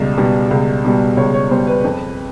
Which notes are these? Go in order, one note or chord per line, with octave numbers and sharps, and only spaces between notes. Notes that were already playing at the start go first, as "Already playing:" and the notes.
Already playing: C#2 B2 G3
B2 G3
C#2
B2 G3
C#2 C#5
C#5
B2 G3 C5
B4
F2